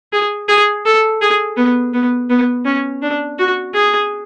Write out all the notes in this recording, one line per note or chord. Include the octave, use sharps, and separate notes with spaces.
G#4
G#4
A4
G#4
B3
B3
B3
C#4
D4
F#4
G#4